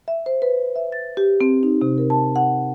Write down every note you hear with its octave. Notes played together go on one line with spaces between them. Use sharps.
E5
C5
B4
E5
A6
G4
C4
D#4
C3
A#4
A5
F#5